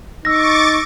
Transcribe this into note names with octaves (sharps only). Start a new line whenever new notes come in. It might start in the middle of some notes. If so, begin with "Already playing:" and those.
D#4 C#6 D6 E6 A6 A#6